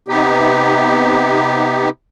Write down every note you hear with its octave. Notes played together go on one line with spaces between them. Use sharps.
C3 B3 D#4 G4